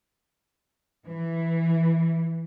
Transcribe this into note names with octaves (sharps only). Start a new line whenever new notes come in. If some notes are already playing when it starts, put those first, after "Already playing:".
E3